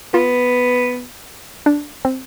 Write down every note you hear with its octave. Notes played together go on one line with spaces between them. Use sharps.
B3 F4
D4
C4